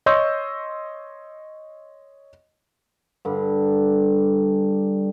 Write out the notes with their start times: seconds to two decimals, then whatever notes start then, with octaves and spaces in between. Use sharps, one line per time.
0.06 C#5 D#5 C6 C#6 E6 G6
3.25 G2 D3 G3